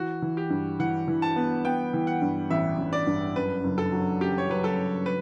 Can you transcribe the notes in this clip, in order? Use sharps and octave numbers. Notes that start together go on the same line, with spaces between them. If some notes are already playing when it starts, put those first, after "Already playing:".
Already playing: E3 F#4
E3
G4
G2
E3 F#5
E3
A5
B3
B3 G5
E3
F#5
G2
A1 E5
A1
D5
G2
F#2 B4
F#1
A4
F#3
C#3 G4
C#5
F#3 B4
A4
F#3
B4